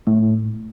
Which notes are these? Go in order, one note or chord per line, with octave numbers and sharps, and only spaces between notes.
A2